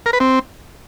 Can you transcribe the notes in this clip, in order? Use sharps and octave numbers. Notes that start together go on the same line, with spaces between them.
A#4
B4
C4